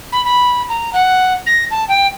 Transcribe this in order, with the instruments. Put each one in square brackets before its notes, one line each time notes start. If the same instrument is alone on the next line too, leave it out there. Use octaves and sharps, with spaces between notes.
[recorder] B5
B5
A#5
F#5
A#6
A5
G5